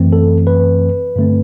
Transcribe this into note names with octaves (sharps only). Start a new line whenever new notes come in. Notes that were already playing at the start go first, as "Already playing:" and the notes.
Already playing: F#2 E3 A3 C4
A4
B4
G2 D3 A3 C4